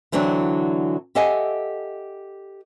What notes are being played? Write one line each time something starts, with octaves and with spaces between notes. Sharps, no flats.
D3 E3 F#3 C4 D4
G4 A4 D#5 E5 F#5 G#5